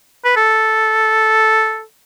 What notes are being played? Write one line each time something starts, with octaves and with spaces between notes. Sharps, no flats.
B4
A4